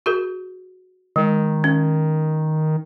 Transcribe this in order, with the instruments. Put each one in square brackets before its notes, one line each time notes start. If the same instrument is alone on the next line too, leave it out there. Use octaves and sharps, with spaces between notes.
[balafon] F#4 G#4 A#4
[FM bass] D#3 [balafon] G#3
[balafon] C#4